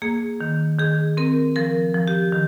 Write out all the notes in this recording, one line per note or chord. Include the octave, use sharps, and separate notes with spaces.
A#3 G#4
D#3
D#3 G#4
C4 A#4
F3 A#4
F3
G4
D#3